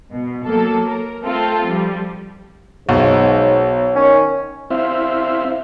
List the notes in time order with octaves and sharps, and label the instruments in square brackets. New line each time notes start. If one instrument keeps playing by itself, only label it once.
[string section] B2
F#3 A#3 A4
A#4
A3 C4 F4 A4
F3 G3
[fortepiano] B1 [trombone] G#2 [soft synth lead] C#5
[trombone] D#3 [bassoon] C#4
[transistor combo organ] C4 E4 C5 E5 F5